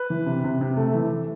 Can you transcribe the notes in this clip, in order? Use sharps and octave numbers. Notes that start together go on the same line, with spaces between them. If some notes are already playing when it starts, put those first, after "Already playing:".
Already playing: B4
E3
C3
C3
C3
A3
E3